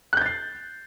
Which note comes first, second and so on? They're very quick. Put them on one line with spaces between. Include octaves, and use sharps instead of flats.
F#6 G6 A6 C7